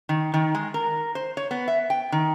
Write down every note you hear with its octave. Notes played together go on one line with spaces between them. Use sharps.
D#3
D#3
G#3
A#4
C5
C#5
B3
E5
G5
D#3